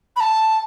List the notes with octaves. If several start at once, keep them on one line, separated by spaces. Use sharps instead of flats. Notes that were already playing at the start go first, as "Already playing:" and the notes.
B5
A5